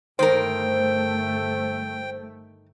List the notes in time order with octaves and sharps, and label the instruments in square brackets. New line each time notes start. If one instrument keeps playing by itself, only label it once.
[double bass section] G1 A3 [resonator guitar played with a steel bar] D#3 A#4 [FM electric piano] C5 [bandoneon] G5